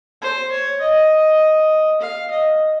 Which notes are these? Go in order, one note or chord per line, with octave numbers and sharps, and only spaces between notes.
C5
C#5
D#5
F5
D#5